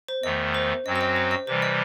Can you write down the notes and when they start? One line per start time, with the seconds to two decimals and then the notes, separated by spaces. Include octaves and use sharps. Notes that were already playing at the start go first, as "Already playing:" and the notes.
0.08 C5
0.23 E2 D#3 A3 D#5
0.54 C5
0.86 F#2 F#3 C4 F#4 D#5
0.96 C5
1.01 D#5
1.16 C5
1.31 D#5
1.47 C3 E3 G3 C5
1.62 D#5